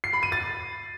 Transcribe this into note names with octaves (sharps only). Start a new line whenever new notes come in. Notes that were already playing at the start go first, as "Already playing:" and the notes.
C7
B5
D#7
A6